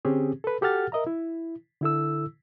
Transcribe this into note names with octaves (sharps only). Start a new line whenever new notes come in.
D3 C4 C#4 G4 G#4
A4 B4
F#4 G4 A4 F#5 F6 A6
A#4 D#5 E5 A#5
E4
D3 E4 A4 E6